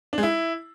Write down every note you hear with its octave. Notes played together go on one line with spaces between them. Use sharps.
D4
G#3
E4